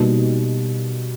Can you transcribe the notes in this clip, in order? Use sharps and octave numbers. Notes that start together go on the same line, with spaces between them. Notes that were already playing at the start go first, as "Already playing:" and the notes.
Already playing: B2 G3 A#3 D#4